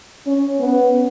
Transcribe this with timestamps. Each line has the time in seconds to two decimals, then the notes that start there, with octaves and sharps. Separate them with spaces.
0.26 C#4
0.59 B3